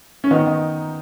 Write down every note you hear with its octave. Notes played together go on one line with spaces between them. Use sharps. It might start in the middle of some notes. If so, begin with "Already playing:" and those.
C#4
D#3 B3 D#4
D#3